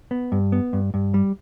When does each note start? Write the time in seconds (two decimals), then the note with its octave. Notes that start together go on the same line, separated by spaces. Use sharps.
0.11 B3
0.32 G2
0.52 B3
0.73 G2
0.94 G2
1.14 G3